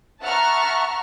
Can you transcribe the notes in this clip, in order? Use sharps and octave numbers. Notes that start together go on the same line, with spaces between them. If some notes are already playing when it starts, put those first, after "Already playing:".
E5 F#5 A5 A#5 C#6 F6